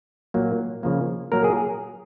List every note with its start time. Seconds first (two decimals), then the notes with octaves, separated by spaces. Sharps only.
0.34 A#2 F#3 A#3
0.83 C#3 F3 A#3
1.32 A#2 F#3 A#3 A#4
1.44 G#4